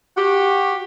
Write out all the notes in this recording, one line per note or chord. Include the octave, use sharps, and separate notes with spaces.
F#4 G4